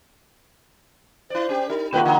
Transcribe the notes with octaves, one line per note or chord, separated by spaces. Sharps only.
E4 C5 D5
C#4 G4
D#4 A#4
B2 D#3 A#3 F4 F#4 B4
D3 D#4